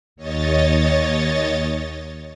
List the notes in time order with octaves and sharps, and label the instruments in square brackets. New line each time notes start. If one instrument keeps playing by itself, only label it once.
[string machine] D#2 C#5 D#5 A6